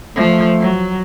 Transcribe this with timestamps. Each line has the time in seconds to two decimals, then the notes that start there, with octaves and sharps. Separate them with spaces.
0.16 F3 A3
0.60 F#3